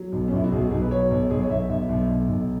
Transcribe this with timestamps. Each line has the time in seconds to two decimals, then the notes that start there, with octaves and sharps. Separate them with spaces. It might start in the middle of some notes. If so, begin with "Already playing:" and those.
Already playing: F#3
0.12 B1
0.28 C#4
0.32 B1 E4
0.44 F#4
0.52 B1 G#4
0.62 F#4
0.71 B1 G#4
0.82 B4
0.91 F#3 C#5
1.11 B1
1.30 B1 G#4
1.41 C#5
1.50 B1 E5
1.70 B1 E5
1.89 B1
2.09 B1
2.29 B1